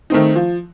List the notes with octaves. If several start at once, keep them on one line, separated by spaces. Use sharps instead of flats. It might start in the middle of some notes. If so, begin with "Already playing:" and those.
D#3 A3 C4 D#4
F3